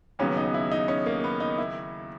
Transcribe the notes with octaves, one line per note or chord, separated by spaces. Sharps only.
D#2 C#3 F#3 B3 C#4
D#4
E4
D#4
C#4
A#3
B3
D#4
E4